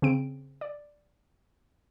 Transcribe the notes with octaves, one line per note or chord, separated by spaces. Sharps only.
C#3 C4 D7
D5